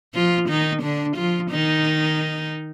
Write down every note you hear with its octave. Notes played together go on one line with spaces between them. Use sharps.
F3 F4
D#3 D#4
D3 D4
F3 F4
D#3 D#4